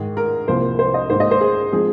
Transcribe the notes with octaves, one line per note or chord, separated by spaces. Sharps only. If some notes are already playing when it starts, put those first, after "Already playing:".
Already playing: G#2 D#3 G#3 G#4
A#4
C2 C3 F3 A#3 C5
C5
D#5
G#2 D#3 A#3 C5
D#5
C5
G#4
F3 G#3 C4 G#4